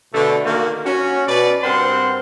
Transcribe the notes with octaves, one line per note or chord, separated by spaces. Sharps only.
B2 D3 A3
D#3 A#3 F#4
C#4 F#4
B2 B4 D5
G2 C4 A#4 C5 F#5 C6